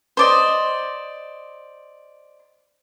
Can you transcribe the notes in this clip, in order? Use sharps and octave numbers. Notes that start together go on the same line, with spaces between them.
C5 D5 D#5